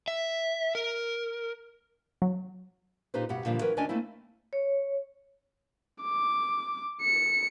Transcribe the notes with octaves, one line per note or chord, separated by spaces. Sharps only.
E5
A#4
F#3
A#2 D#4 G4 B4 C5
G2 B2 G4 F#5
A#2 D3 E3 F3 G3
E3 F#3 A#4 B4
D2 C#4 D4 D5 D#5 G#5
A3 A#3 C4 E4
C#5
D6
C#7